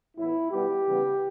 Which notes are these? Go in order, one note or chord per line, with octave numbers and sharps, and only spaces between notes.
A2 E3 B3 E4
B2 G3 B3 G4
C#3 E3 G3 B3